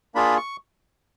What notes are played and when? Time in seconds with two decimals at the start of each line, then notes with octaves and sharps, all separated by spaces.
0.15 A#3 D4 F4 G#4 B5
0.37 C#6